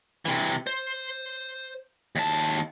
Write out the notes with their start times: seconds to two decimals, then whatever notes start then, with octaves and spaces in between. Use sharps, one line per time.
0.25 C3 E3
0.67 C5
2.16 D#2 A5